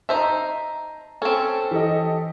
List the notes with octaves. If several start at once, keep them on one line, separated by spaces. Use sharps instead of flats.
D#4 C5 E5 A5 A#5
C4 C#4 A4
E3 G4 A4 D#5